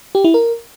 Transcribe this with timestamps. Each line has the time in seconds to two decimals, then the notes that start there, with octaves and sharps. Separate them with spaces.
0.15 G4
0.24 E4
0.34 A#4